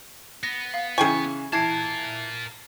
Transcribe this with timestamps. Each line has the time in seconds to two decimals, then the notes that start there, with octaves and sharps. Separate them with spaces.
0.43 B3 A#6
0.74 F5
0.98 C#3 E3 G#4 G5 G#5 C#6
1.53 E3 F4 A#4 A5 G#6 C7